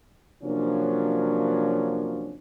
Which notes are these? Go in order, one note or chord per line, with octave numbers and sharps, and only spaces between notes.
C3 F3 F#3 A#3 C#4 D4